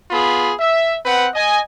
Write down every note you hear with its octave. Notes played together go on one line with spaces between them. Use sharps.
B3 F4 G#4 B5
E5
C4 B4 F#5
D#5 G#5